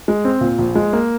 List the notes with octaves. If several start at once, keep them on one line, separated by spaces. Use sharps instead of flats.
G#3
C4
A#2
A#1
G#3
A#3